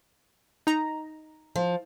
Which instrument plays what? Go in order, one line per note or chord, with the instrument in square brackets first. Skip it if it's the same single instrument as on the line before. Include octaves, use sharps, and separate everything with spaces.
[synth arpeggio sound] D#4 A#5
[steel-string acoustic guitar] F3